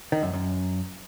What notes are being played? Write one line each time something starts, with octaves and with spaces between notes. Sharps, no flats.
D#3
F#2
F#2